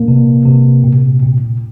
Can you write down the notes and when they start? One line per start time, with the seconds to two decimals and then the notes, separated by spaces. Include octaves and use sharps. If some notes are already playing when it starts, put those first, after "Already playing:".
Already playing: A#2 A#3
0.08 C3
0.46 C3
0.84 A#2
1.22 A#2